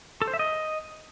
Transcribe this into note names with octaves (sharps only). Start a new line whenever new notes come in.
A4
C5
E5
D#5